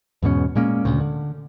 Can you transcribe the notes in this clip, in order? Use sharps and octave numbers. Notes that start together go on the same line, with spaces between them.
E2 G#2 B2 C#4
A#2 G#3 A#3 C#4
D2 A#2 C#3
D3